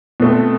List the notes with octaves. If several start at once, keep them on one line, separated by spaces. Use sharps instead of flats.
B2 A3 C4